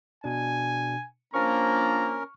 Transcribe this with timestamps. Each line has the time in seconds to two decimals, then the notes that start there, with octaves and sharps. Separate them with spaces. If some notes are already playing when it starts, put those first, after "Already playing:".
0.24 B2 D4 G#5
1.34 F3 A#3 C#4 D4 A#4 A#5 C#6 F6